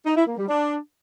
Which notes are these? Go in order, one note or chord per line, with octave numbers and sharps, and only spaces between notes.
D#4
E4
A#3
G3
D4